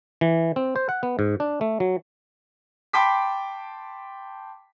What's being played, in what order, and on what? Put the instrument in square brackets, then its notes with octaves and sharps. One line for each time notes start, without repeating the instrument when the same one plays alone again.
[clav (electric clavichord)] E3
C4
C5
F#5
B3
G#2
D4
A3
F#3
[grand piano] G5 A5 B5 C6 D6 B6